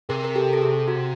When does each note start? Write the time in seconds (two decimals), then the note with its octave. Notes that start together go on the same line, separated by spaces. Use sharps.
0.09 C3 G#4 A#4
0.24 A#4
0.36 G4 A4
0.53 A4
0.62 G#4
0.88 F#4